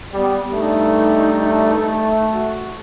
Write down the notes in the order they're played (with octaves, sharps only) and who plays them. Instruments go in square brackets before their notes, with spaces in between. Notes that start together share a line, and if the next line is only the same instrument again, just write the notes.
[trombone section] G3 [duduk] B3
[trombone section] G2 A3 [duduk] D#4
[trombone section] A3
[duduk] F#4